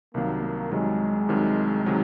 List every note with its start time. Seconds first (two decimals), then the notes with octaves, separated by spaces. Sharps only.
0.14 C2 C3 D#3 F#3 A#3
0.42 A#3
0.71 C2 C3 D#3 F#3 G#3
1.29 C2 C3 D#3 F#3
1.86 C3 D#3 F#3